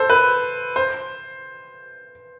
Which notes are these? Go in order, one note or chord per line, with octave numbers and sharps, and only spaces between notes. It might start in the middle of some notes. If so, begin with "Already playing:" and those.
Already playing: A4 C5
B4
C5